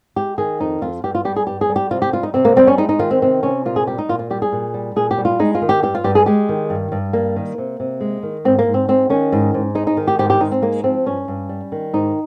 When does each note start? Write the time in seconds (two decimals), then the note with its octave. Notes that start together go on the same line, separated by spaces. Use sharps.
0.16 G#3 G4
0.38 D#3 G#4
0.60 F2 D#4
0.82 F2 F4
1.04 G2 G4
1.15 F4
1.25 G3 G4
1.36 G#4
1.47 G2 G4
1.61 G#4
1.69 G3
1.76 G4
1.91 C3 F4
2.02 G4
2.13 G3 F4
2.23 D#4
2.34 C3 C4
2.45 A#3
2.56 G3 C4
2.67 C#4
2.78 G#3 D#4
2.89 D#4
2.99 D#3 F4
3.11 C4
3.22 C3 C4
3.43 C3 C#4
3.65 A#2 F4
3.76 G#4
3.87 G3 G4
3.98 D#4
4.09 A#2 F4
4.19 F4
4.30 G3 G4
4.42 G#4
4.52 A#2
4.74 G3
4.96 A#2 G#4
5.11 G4
5.18 G3
5.25 F4
5.39 G#3 D#4
5.55 F4
5.62 D#3
5.69 G4
5.83 G2 G4
5.95 F4
6.04 G2 G4
6.15 G#4
6.26 G#3 G4
6.49 D#3
6.70 G2
6.92 G2
7.13 G3 A#3
7.36 D#3
7.58 C3
7.80 C3
8.00 G#3
8.23 D#3
8.45 G#2 C4
8.59 A#3
8.67 G#2
8.74 C4
8.88 G#3 C4
9.10 D#3 C#4
9.32 G#2
9.54 G#2
9.75 G#3 D#4
9.87 D#4
9.97 D#3
10.08 G4
10.19 G#2 G4
10.30 G4
10.40 G#2 D#4
10.52 C4
10.62 G#3 A#3
10.84 F3 C4
11.06 G2 C#4
11.28 G2
11.49 G3
11.72 D#3
11.93 G#2 D#4